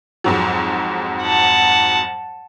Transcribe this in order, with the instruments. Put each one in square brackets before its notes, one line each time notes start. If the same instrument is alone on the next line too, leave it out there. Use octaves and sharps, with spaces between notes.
[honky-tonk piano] F2 G#2 F#3
[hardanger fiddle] F#5 A5